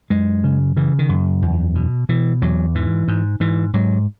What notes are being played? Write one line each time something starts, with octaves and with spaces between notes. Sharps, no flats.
F#2 G#3
C#3
C#3 E3
D#3
F#2
E2
B2
B2 E3
E2 F#3
G#2 E3
G#2
G#2 E3
G#2 F#3